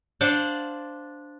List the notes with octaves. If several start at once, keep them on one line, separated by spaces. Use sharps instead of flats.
D4 C5 D5 F5 F#5